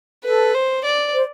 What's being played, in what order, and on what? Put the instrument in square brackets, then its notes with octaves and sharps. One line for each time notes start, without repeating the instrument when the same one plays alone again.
[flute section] A4 [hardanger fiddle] B4
[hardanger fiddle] C5
D5
[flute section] C5